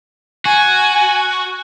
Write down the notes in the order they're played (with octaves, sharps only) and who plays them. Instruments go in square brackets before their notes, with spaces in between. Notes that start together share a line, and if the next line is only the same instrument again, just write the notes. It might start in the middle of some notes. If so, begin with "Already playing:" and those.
[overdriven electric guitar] F#4 [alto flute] G#5